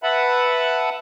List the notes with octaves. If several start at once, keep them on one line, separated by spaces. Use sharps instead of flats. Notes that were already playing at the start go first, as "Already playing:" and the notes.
B4 E5 F#5 A5 B5